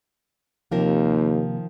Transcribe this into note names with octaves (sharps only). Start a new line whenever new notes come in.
D#2 C3 D#3 F3 A#3 A#4